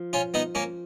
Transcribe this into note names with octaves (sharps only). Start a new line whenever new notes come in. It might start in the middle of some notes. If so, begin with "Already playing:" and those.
Already playing: F3
C#4 F4
B3 D#4
A#3 C#4